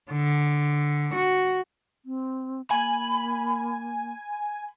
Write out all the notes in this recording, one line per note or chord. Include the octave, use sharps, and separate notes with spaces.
D3
F#4
C4
A#3 G#5 B5